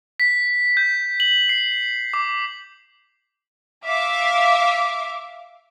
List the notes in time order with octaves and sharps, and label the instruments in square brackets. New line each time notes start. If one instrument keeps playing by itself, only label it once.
[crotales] B6
G6
F#7
C7
D6
[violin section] E5 F5 D6